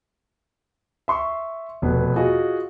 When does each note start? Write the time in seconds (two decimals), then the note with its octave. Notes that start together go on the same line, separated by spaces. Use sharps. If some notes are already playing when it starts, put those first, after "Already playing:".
1.08 E5 C6 C#6
1.82 F1 B2 B4
2.16 F4 F#4 G#4 D#5 G#5